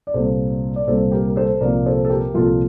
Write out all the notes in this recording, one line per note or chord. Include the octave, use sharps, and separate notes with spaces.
D5
C2 A#2 G3 A4 C5
D5
C2 A#2 G3 A4 C5
G4 A#4
A#4
A4 C5
C2 A#2 F3 A#4 D5
A4 C5
A4
G4 A#4
C2 A#2 F3 F4 A4